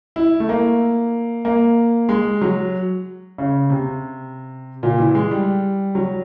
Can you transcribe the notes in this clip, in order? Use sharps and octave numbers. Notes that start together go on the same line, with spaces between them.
E4
A3
A#3
A#3
G#3
F#3
C#3
C3
A#2
E3
G#3
G3
F#3